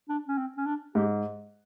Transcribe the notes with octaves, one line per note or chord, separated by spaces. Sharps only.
D4
C#4
C4
C#4
D4
G#2 G4